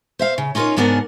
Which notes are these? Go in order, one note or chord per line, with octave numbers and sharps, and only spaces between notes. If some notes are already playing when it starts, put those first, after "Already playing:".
C5 E5 F5
C#3
C#4 D#4 F4 G#4 A#4 C#5
G#2 C#3 B3 D4 A#4 F#5